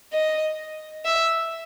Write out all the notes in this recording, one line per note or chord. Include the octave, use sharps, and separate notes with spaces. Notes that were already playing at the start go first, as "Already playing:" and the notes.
D#5
E5